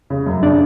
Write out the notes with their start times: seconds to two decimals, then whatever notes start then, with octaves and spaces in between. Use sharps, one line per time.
0.10 C#3
0.26 F#2
0.43 C#3 D4